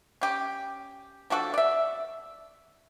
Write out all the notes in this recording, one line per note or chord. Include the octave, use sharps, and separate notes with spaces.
C#4 G4
F3 D4 F#4 A4
D5 E5